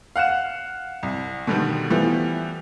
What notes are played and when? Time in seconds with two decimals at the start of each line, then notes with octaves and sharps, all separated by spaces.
0.16 F5 F#5 F#6 E7
1.03 C2
1.47 B2 D3 D#3 G3 B3
1.90 E3 F3 G3 A3 B3